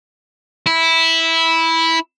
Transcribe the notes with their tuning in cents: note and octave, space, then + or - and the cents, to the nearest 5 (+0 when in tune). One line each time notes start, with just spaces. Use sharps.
E4 -10